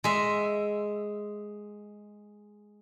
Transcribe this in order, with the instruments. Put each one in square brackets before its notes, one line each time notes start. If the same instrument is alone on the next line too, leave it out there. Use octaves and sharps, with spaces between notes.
[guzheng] G#3 E5